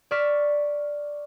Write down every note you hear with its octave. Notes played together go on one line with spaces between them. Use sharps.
D5 C#6 F6 B6 E7